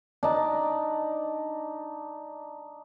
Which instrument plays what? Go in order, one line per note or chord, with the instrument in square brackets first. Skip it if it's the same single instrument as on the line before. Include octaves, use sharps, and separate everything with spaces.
[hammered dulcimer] D4 D#4 A5